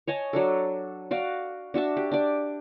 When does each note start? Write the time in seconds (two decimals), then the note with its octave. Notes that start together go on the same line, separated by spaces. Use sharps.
0.08 C#5 D#5 G#5 A5
0.33 F#3 D4 A4
1.11 F#4 D5 F5
1.74 D4 F#4 E5 A5
1.97 G4
2.12 D4 D5